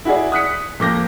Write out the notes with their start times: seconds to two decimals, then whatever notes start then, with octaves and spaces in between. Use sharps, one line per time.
0.05 E4 F#4 G#4 D5
0.32 D#6 F#6 B6 C#7
0.80 F2 A#3 D6 G6 A#6